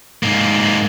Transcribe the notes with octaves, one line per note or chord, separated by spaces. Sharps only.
G#2 A#3